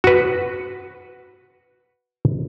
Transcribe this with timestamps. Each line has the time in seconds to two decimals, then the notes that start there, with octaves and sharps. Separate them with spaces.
0.04 F#4 B4